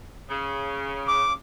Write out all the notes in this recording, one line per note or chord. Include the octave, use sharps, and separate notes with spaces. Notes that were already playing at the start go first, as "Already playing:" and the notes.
C#3
D6